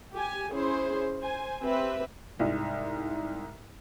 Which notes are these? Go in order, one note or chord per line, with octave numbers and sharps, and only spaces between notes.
G4 G#5
C#4 E4 G#4 C5
C5 G#5
C4 G4 B4 E5
C2 G#2